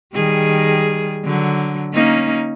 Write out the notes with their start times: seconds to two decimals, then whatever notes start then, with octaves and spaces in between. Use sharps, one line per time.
0.14 D#3 G3 G#4
1.24 D3 F#3
1.94 A#3 C#4 D#4